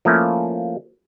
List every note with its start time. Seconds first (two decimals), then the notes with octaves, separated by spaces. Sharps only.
0.05 F3 A3 A#3 C#4 E4